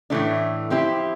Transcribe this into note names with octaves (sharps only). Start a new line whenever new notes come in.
A2 E3 A3 D4
F3 C4 E4 G4